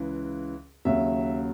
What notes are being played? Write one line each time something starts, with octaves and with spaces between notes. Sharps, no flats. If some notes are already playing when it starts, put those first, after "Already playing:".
Already playing: C#2 C#3 E3
D#2 C#3 F#3 E5